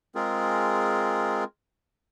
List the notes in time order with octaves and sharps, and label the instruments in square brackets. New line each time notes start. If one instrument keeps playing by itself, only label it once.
[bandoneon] G#3 C4 F4 G#4 A#4